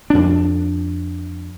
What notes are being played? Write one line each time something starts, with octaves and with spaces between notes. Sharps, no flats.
F2 D4